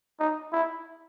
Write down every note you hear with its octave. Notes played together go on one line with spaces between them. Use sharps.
D#4
E4